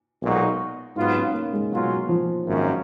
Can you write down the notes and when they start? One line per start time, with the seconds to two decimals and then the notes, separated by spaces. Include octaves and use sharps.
0.21 B1 A#2 G#3 D#4 F#4
0.96 G#2 F#3 B3 D#4 F4
1.15 C#4
1.34 A#3
1.53 G#3
1.72 B2 F#3 C#4 F4
2.09 F3
2.46 G#1 F#2 D#3 A#3 C#4